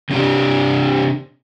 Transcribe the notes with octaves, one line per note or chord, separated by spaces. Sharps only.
C3 C4 D4 G4 D5